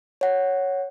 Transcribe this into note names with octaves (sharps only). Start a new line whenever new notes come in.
C#5 F#5